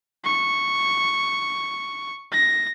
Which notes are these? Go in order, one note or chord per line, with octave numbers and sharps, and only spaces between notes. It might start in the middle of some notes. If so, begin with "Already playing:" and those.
C#6
A#6